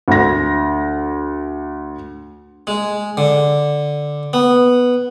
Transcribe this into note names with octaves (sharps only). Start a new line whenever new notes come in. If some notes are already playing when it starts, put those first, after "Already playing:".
D2 A#6
G#3
D3
B3